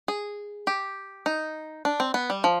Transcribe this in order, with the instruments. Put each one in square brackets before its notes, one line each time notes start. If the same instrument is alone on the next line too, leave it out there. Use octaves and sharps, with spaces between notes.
[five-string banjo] G#4
G4
D#4
D4
C4
B3
G3
F3